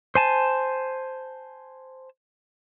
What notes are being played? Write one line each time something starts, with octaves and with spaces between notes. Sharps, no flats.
C5 G#5 A5